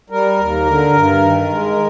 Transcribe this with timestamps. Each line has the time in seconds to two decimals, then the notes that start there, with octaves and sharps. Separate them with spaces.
0.10 G3 A#4
0.37 D#2
0.66 D3
0.93 G2
1.21 D#3
1.50 G#3